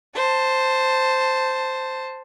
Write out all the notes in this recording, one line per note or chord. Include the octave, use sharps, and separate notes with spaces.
C5 A5